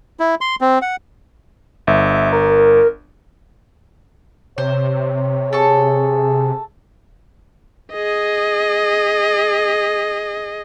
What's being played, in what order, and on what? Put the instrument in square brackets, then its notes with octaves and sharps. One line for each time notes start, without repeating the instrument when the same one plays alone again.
[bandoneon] E4
C6
C4
F#5
[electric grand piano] G1 [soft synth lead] E5
[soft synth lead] A#4
[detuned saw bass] C3 [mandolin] C5 [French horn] C#5
[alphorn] G#4 [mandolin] A4 C#6
[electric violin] G#4 D#5